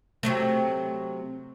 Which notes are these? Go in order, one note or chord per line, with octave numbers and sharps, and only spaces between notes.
C3 F#3 A3